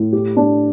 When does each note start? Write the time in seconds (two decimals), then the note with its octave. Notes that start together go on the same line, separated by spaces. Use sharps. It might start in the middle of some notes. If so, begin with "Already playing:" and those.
Already playing: A2
0.13 G4
0.37 D4